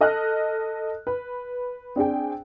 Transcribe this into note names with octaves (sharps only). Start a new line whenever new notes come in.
A4 D#5 F6 F#6
B4
C4 D4 G#4 G5